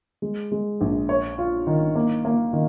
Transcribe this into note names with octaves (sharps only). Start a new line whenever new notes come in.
G#3
G#3
A#1
C#5
F4
D#3
A#3
A#3
D#3